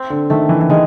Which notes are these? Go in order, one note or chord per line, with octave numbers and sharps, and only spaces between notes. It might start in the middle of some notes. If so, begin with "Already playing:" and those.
Already playing: C4
D3
D#3 A3
E3
E3
D#3 G#3